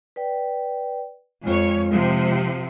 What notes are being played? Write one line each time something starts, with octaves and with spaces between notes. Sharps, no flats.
B4 D5 G5
F2 G#3 F4 C#5
C3 F3